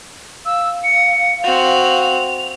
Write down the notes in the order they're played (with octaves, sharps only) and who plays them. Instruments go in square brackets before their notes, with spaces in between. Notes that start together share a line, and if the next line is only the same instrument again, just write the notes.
[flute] F5 [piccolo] E6
[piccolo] C#7
[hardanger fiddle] C4 F#4 [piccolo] F7